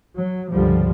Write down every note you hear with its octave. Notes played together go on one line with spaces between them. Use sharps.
F#3
C#2 G2 D3 F3 G3